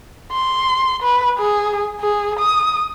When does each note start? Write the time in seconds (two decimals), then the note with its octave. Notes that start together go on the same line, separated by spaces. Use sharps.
0.32 C6
1.03 B4
1.39 G#4
2.01 G#4
2.39 D#6